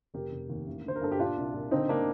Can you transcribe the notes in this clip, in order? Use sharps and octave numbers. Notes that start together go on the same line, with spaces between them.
F1 G4 A#4
F1
D#2
A1
D3 C5
A#4
G2 A4
G4
A#2 D4 F4
C2
A#2
D3 C4 D#4
D3 A#3 D4